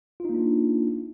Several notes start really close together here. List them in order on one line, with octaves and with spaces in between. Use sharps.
F4 D#4 A#3 D4